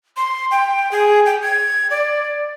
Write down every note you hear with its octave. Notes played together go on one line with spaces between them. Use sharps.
C6
G5
G#4
G5
G#6
D5